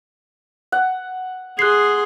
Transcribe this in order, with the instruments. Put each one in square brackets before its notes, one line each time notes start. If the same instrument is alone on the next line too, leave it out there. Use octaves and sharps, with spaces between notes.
[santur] F#5
[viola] G#4 C6 [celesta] F#6 C7